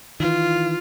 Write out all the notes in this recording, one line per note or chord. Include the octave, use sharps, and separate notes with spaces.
D#3 E3 F4